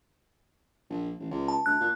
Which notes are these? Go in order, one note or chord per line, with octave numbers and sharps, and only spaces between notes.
A#1
A1
C#2
A5
D2 F#6
A#2